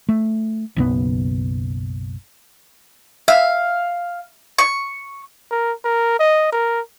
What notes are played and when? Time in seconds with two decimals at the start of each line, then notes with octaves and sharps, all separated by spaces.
0.09 A3
0.77 F#1 B1 B3
3.28 E5 F5
4.58 C#6
5.51 A#4
5.85 A#4
6.20 D#5
6.52 A#4